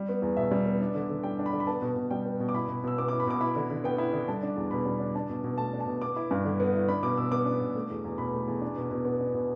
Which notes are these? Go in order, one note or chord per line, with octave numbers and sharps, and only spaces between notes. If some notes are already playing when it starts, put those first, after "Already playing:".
Already playing: G3
B3
E2
B2 E5
G3
B3
D4
D3
D3
G3 G5
D4
B5
D3
B5
B3 A5
B2
B2
G3 G5
B3
B2
D6
E4 B5
B2
B2 E6
B3 D6
E4 D6
B5
B2 D6
E4 B5
D3
D3
B3 G5
E4
D3
G3 A5
D4
E2
B2 B5
G3
D4
D4 A5
B2
B2
A3 A5
D4
A5
B2
B3 D6
E4
G2
D3
B3
E4
D4 B5
B2 D6
B2 E6
B3 D6
D4
B2
A3
E2
E2
B2 B5
A3
E2
D4
B2
B2
B3
D4
B2